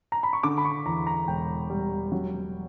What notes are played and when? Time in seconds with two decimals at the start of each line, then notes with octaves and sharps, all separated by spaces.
0.12 A#5
0.23 B5
0.33 C#6
0.43 D3 D6
0.58 B5
0.65 C#6
0.86 E2 A#5
1.07 A#5
1.28 E1 G5
1.70 G3
2.12 F#3